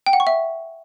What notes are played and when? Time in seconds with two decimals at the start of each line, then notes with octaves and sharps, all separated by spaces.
0.06 G5
0.13 F#5
0.20 C#6
0.27 E5